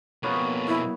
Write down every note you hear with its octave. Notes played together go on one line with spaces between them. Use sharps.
F2 B2 A#3 B3 C#5
E4